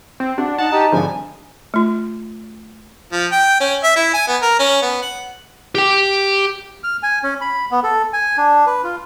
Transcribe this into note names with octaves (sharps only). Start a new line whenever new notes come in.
C4
D4 F#4
D#4 F#5 A5
D#4 G4
G#1 D3 F3 G3 G#5
A3 F4
F3
G5
C#4
E5
E4
G#5
B3
A#4
C#4
B3
F#5
G4 G5
F6
G#5
C#4
B5
B3
A4
G#5
D4
B4
F4